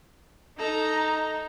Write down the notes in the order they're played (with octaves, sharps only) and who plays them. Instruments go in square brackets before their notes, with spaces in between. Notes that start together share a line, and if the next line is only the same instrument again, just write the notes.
[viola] D#4 [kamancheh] A4 A#5